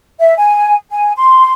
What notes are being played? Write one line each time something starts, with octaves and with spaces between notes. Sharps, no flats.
E5
G#5
G#5
C6